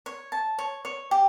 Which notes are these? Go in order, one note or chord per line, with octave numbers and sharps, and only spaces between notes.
C#5
A5
C#5
C#5
G4